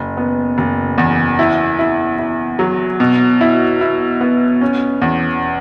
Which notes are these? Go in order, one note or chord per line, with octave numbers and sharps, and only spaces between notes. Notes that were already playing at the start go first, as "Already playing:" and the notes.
Already playing: F#1
B3
F#1
E2
E4
E4
E4
F#3
B2
E4
E4
B3
C#4
E2